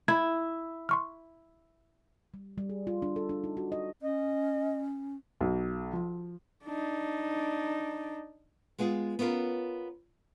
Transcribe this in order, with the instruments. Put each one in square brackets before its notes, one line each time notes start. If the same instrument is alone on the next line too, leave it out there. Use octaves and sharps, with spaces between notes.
[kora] E4 [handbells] G#6
[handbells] C6 C#6 F6
[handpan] G3
G3
G#4
F4
D4
A4
D4
D#4
F#4
D#5
[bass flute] C#4 [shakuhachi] D#5
[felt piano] B1
F3
[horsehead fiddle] D4 D#4
[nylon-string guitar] G#3 B3 F4 G#4
B3 C#4 F4 A#4